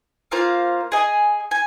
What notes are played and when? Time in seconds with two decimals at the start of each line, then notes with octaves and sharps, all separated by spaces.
0.31 A#3 F4 C5 F5
0.92 G#4 D#5 G#5
1.51 G#5